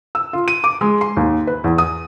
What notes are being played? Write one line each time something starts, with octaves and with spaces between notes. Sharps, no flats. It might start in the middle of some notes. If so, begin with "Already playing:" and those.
E6
F4
D#7
D6
G#3
C6
D#2
B4
E2
D#6